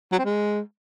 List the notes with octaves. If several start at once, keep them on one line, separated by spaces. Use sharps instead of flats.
F#3
C4
G#3